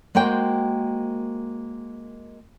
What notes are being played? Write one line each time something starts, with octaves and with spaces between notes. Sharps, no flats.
G#3 A#3 F#4 C5 G5